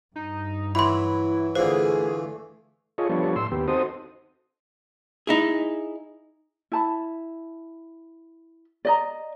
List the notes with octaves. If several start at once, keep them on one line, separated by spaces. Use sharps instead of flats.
G2 D#4
E3 F#3 E4 B5 C6
D3 E3 A3 F4 G#4 C5
F4 G#4 A4 C#5 D#5
F3 G3 B3 D4 A4 C#5
A2 C6 E6
D#2 B3 G4
C4 D#4 F#4 A4 C5 D#6
D#4 E4 G#4
E4 A5 B5
D5 D#5 A#5